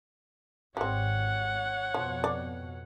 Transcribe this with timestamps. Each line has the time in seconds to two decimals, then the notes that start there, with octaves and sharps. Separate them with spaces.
0.77 G#1 G3 C4 C#5 F#5
1.94 F2 B2 F3
2.24 D5